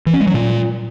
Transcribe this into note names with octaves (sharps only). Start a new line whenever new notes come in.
E3
C#4
G#3
F#3
A#2